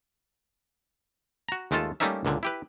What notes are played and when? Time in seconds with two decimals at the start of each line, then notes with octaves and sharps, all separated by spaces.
1.49 F#4 A#5
1.71 D#2 G#3 A3 F4 A4 A5
2.00 G3 A3 A#3 C#4 D#4 E5
2.25 C#2 A#2 D3
2.43 E4 G4 B4